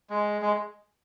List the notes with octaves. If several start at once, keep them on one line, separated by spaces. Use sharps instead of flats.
G#3
G#3